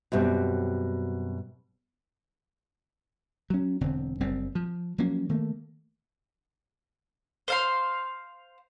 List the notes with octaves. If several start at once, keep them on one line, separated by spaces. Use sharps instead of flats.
F#2 B2 G3 C4
F#3 C#4
E1 D3 C4
F#1 G3 C4
F3
F3 F#3 A#3 C#4
D#3 A3 A#3
C5 F5 C6